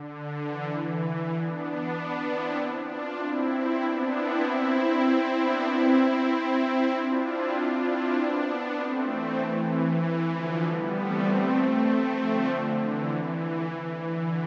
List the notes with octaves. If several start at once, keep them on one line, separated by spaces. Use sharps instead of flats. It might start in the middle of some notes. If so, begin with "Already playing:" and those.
Already playing: D3
E3
B3 D4
C4 E4
D4 F4
C4 E4
B3 D4
C4 E4
C4 E4
B3 D4
C4 E4
C4 E4
D4 F4
C4 E4
D4 F4
C4 E4
B3 D4
A3 C4
E3
E3
D3 F3
G3 B3
A3 C4
A3 C4
D3 F3
D3
E3
E3
D3